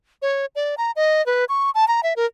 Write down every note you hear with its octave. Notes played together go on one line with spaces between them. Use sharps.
C#5
D5
A#5
D#5
B4
C#6
A5
A#5
E5
A#4